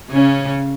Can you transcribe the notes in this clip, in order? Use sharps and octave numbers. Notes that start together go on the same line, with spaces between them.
C#3 C#4